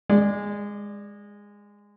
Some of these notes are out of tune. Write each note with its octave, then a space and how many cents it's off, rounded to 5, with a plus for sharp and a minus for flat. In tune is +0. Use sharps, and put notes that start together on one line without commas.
G#3 -15 D5 +10